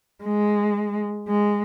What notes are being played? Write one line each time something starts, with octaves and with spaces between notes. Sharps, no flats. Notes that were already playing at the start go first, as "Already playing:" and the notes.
G#3
G#3